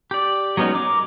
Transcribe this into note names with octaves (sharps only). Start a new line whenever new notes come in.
G4 D5
F#3 G#3 B3 C#4 D#4
A#4 D6